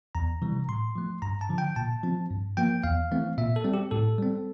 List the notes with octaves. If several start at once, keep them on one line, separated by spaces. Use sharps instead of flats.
E2 A#5
C3 E3 G3
A2 C6
F3 A3
G2 A#5
A5
D3 F3
G5
A#2 A5
F3 C4
G2
F3 A#3 G5
E2 F5
E3 A3 C4
A#2 E5
A4
G3 C4
G4
A2 A4
G3 C4